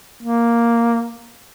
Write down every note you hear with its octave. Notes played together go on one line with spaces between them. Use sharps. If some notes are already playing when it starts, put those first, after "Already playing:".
A#3